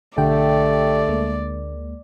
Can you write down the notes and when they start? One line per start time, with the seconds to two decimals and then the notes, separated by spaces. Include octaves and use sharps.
0.18 B1 D3 A3 G4 D5 G5
1.08 D2 G#3 A#3